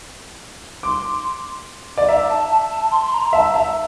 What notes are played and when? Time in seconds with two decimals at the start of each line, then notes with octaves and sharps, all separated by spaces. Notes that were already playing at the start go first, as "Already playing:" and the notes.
0.83 C6 D6
1.98 D5
2.08 E5 A#5
2.29 A5
2.50 A5
2.70 A5
2.91 C6
3.06 C6
3.12 A#5
3.23 A#5
3.33 E5 A5
3.54 E5 A#5